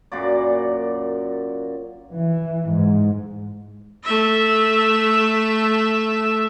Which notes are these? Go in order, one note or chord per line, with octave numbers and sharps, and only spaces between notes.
F#2 A#2 F#4 D5
E3
G#2
A3 E5